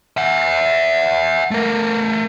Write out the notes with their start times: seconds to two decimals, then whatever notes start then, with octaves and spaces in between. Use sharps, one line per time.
0.17 E5 F#5
1.51 A3 A#4